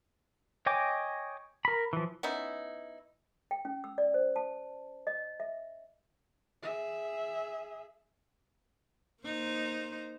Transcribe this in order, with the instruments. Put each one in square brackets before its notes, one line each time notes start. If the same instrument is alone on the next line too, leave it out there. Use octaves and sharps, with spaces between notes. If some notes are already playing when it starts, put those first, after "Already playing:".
[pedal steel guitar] C#5 D#5 G5 G#5 D6
A#4 B5
E3 F3
[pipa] B3 C#4 D#4 E4
[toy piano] G5
C#4
E6
D5
C5
A5
D#5
E5
[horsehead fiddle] G#4 E5
[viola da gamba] A#3 D#4 C5